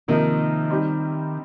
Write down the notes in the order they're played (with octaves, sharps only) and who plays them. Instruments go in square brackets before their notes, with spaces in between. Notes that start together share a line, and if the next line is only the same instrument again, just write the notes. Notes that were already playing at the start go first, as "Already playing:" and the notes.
[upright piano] C3 F3 A#3 D#4 [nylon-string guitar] D#3
[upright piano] G3 C4 D#4 G4